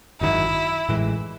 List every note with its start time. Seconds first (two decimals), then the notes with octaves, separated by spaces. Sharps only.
0.21 G#1 F#2 D#3 F#3 E4
0.89 A1 A2 E3 G#3